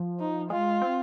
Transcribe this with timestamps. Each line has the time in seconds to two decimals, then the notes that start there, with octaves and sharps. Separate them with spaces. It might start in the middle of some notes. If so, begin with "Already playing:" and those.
Already playing: F3
0.20 D#4
0.50 G#3 F4
0.82 C4